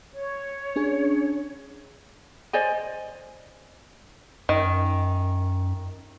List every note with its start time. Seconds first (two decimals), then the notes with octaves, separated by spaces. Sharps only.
0.13 C#5
0.76 C#4 D4 G#4
2.53 C5 D5 D#5 G#5
4.49 F#2 D#3